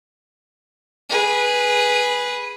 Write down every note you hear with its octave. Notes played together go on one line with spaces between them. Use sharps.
G#4 B4